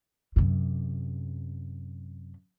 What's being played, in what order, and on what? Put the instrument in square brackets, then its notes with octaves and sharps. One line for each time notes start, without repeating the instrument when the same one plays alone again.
[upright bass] F#2 C3